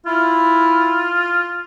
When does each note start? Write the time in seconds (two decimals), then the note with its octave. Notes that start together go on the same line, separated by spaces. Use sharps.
0.06 E4 F4